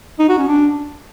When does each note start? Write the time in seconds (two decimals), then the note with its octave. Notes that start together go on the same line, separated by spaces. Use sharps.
0.19 D#4
0.29 F#4
0.38 C#4
0.47 D4